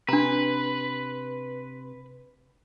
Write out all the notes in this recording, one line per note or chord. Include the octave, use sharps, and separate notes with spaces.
C3 D4 B4 A#5 C6